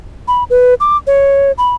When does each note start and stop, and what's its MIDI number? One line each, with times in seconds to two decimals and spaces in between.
0.28 0.44 83
0.50 0.74 71
0.80 0.97 86
1.07 1.52 73
1.58 1.75 83